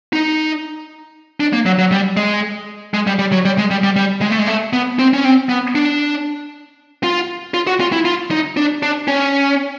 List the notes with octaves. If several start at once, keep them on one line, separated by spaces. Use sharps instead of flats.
D#4
D4
A#3
F#3
F#3
G3
G#3
G#3
G3
G3
F#3
G3
G#3
G3
G3
G3
G#3
A3
G#3
A3
B3
C4
C#4
C4
B3
D4
F4
F4
F#4
F4
E4
F4
D#4
D4
D4
C#4